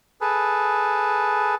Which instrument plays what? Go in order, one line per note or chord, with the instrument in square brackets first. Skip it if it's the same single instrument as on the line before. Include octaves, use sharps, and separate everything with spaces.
[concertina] G#4 A4 B4